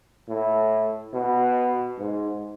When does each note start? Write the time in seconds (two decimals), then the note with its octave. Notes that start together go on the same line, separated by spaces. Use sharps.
0.29 A2
1.13 B2
1.99 G#2